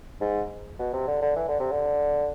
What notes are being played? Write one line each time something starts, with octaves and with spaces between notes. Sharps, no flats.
G#2
B2
C3
D3
D3
E3
D3
C3
D3